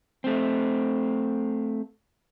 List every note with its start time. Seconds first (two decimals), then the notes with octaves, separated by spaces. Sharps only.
0.24 A3 C4